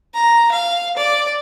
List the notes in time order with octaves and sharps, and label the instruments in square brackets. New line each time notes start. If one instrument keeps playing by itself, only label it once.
[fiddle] A#5
F5
D5